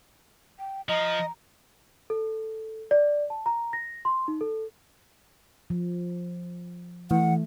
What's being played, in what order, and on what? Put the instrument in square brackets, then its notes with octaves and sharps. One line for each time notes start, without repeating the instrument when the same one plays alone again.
[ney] G5
[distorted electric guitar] F3 [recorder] D#5 [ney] A#5
[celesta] A4
D5
A5
A#5
A#6
C6
D#4
A4
[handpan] F3
[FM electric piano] E3 [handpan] A3 [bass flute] F#5